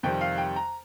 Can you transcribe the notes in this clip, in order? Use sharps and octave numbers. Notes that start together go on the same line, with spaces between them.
F2 C3 D#3 G3 G5
F5
G5
A#5